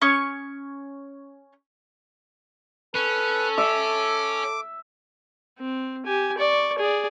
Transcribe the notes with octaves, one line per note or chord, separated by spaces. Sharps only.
C#4 C#5 C#6 D#6
C#4 A4 B4
E5 D6
C4
G4 G#5
D5 C#6
G#4 D5